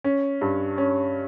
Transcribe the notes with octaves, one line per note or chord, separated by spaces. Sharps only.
C#4
G2
C#4